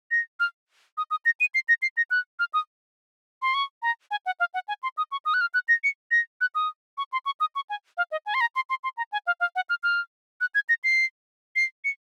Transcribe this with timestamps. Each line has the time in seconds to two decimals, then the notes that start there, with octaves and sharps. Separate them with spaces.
0.11 A#6
0.40 F6
0.97 D#6
1.11 D#6
1.25 A#6
1.40 D#7
1.55 C7
1.69 A#6
1.82 C7
1.97 A#6
2.11 F#6
2.39 F6
2.54 D#6
3.42 C6
3.54 C#6
3.82 A#5
4.11 G#5
4.26 F#5
4.40 F5
4.54 F#5
4.68 G#5
4.83 C6
4.97 D#6
5.12 C#6
5.25 D#6
5.34 F#6
5.41 F6
5.54 F#6
5.68 A#6
5.84 C#7
6.11 A#6
6.41 F#6
6.55 D#6
6.98 C#6
7.13 C6
7.26 C#6
7.40 D#6
7.55 C#6
7.70 G#5
7.97 F5
8.12 D#5
8.26 G#5
8.34 C6
8.41 A#5
8.56 C6
8.70 C6
8.84 C6
8.97 A#5
9.12 G#5
9.27 F5
9.40 F5
9.56 F#5
9.70 F6
9.83 F6
10.41 F#6
10.55 G#6
10.69 A#6
10.84 C7
11.56 C7
11.84 C#7